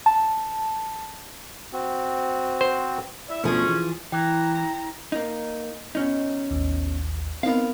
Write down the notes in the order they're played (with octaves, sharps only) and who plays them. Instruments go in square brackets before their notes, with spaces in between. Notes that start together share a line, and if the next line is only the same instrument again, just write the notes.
[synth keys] A5
[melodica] C4 F#4
[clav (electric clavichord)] C5
[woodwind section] E4 D5 E5
[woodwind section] D2 C#4 [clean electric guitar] B2 A3 [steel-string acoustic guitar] F3 G#4
[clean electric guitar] E3
[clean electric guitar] E3 [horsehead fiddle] E4 A#5 [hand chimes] G5
[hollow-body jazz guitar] A#3 D#4
B2 C#4 D#4
[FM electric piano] A1 D#2
[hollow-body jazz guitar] B3 A#4 F5 [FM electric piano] C4 D#4